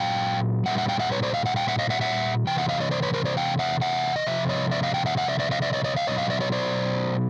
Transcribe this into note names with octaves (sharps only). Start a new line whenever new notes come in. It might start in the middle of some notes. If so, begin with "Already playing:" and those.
Already playing: A#2 F#3 F5 G5
A#2 G3 E5 F#5
E5 F#5
F5 G5
E5 F#5
B4 C#5
C5 D5
D#5 F5
E5 F#5
F5 G5
E5 F#5
D#5 F5
E5 F#5
E5 F#5
C3 E3 G5
E5 F#5
D#5 F5
C#5 D#5
C5 D5
B4 C#5
A#4 C5
C5 D5
F5 G5
E5 F#5
E5 F#5
D#5
C3 F3 E5
C#5 D#5
D5 E5
D#5 F5
F5 G5
E5 F#5
E5 F#5
D5 E5
D5 E5
D#5 F5
D5 E5
C#5 D#5
C#5 D#5
D#5 F5
B2 F#3 C#5 D#5
D#5 F5
D5 E5
C#5 D#5
C5 D5